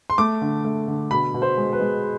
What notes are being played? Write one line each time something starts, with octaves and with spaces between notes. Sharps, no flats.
C6
A3 D6
D3
A3
D3
B2 B5
B2
C5
G#3
B4
G#3